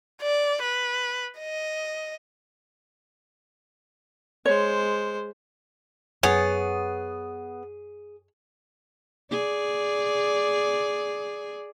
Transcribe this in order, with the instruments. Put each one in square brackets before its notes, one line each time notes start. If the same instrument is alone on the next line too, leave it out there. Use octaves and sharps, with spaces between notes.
[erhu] D5
B4
D#5
[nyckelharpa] G#3 C5 [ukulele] C#5
[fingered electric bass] F#2 [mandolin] B3 [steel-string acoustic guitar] G#4 [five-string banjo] C#5
[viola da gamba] G#4 D5